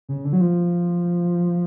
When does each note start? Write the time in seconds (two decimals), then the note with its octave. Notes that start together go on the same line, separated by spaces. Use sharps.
0.09 C#3
0.25 D3
0.33 F#3
0.41 F3